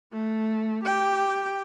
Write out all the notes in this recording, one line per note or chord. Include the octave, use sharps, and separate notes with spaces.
A3
G4 G5